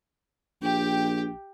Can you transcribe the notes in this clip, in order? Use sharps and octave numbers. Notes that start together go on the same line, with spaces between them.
A#1 G4 G5